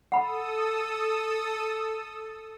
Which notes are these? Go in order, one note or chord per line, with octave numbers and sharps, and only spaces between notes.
A4 F#5 B5 D#6 E6